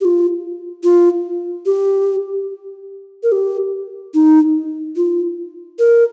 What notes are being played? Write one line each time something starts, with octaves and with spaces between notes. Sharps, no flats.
G4
F4
F4
G4
A#4
G4
D#4
F4
A#4